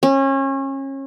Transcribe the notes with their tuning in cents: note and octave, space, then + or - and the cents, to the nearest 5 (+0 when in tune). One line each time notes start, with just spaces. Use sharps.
C#4 -30